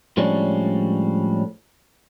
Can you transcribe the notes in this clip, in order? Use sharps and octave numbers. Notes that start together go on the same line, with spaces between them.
A2 F3 G3 G#3 C#4 D4